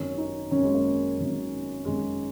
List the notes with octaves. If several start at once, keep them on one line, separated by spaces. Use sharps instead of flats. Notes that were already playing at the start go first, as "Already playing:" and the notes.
Already playing: G#1 F#2 D#3 C#4
D#4
G#1 F#2 D#3 C#4
G#3
A#3
G#1 F#2 D#3
G#1 F#2 D#3 G#3